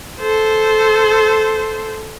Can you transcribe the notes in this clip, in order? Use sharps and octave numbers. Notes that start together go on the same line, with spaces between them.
A4 C5